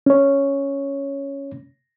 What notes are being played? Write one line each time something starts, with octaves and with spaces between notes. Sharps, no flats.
C#4 C#5